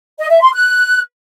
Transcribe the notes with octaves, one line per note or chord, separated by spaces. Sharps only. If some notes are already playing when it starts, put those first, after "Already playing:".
D#5
E5
C6
F#6